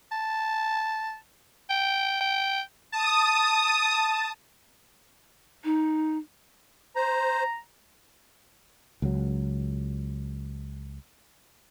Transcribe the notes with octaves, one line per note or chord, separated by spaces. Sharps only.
A5
G5
G5
A5 D#6
D#4
C5 A#5
C#2 F#3